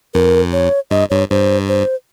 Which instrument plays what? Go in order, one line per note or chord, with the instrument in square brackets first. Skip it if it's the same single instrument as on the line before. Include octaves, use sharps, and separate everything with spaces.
[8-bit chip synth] F2 [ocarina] A#4
[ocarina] C#5
[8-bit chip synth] G2 [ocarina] D#5
[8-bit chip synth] G2 [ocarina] C#5
[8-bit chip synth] G2 [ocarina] C5
[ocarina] C5